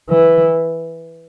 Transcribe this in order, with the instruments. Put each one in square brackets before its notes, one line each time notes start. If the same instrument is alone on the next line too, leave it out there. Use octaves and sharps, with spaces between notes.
[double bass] E3